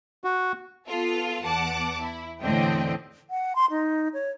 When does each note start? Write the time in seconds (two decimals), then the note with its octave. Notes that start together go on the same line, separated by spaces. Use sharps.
0.24 F#4
0.87 B3 F4 A4
1.42 E2 F#5 A5 D6
2.00 E4
2.42 E2 A2 D3 C4 D#5 G5
3.30 F#5
3.55 C6
3.71 D#4
4.13 C#5